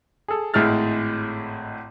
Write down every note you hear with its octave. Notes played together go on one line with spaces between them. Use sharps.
G#4 A4
G#1 A2 G#3 E4 F6 A6